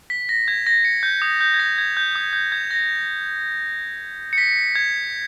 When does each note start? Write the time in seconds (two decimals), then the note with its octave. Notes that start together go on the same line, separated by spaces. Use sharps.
0.10 B6
0.29 A#6
0.48 G#6
0.67 A#6
0.85 C#7
1.03 G6
1.22 D#6
1.41 G6
1.54 G#6
1.60 A#6
1.78 G#6
1.97 G6
2.15 D#6
2.33 G6
2.52 G#6
2.71 A#6
4.33 C#7
4.38 B6
4.75 G#6